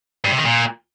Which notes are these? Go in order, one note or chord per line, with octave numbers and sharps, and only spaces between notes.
G2
C3
D#3
A#2